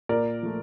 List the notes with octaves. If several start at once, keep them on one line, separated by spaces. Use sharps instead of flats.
A#2 A#4 D5
F3 A3